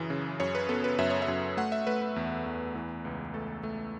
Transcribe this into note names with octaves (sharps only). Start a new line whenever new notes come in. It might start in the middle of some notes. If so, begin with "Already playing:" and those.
Already playing: F#2 C#3 E3
C#3
F#2 C#5
B4
B3 A4
B4
F#2 E5
C#5
E5
F#2
A3 F#5
E5
A3 B4
B4
E2
E2
E3
C#2
A3 A4
A3